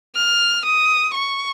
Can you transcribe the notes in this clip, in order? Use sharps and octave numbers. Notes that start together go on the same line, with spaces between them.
F6
D#6
C#6